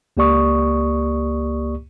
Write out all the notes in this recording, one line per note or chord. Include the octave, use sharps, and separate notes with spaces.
C#2 A#3 G4 D5 C#6 D#6